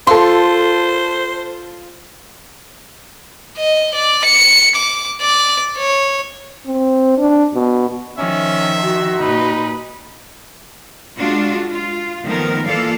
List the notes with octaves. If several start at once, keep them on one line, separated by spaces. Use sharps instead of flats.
F4 A4 C5 C6
D#5
D5
C#7
D6
D5
C#5
C4
D4
B2
D#3 F3 C#4 E5
F#4
A#2 D#4 B4
G#3 D4 F4 F#4
F4
D#3 F3 A3 B3 A#4
E3 A#3 F4 A4 D5 F5